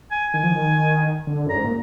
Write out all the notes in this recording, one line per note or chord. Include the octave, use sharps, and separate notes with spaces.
G#5
D#3 G#5
F3
D#3
D3
F#2 A#5
G#2
A#2